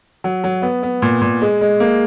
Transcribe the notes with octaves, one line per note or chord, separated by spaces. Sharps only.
F#3
F#3
B3
B3
A#2
A#2
G#3
G#3
A#3